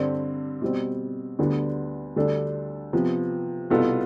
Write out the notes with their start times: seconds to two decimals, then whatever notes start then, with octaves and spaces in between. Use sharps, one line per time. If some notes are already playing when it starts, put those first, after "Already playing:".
Already playing: G2 D3 G3 C4
0.62 B2 G3 C4
1.39 D2 D3 G3 B3 D4
2.16 D2 D3 G3 D4 A4
2.93 C3 F3 B3
3.70 C2 B2 B3 F4 A4